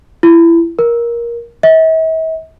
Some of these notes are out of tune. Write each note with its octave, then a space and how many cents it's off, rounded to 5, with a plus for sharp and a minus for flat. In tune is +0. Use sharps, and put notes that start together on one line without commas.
E4 +25
A#4 +15
E5 -45